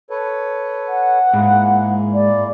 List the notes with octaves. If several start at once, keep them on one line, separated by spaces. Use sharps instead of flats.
A4 B4 C#5
F#5
G#2 G#3 A#3 E4
D5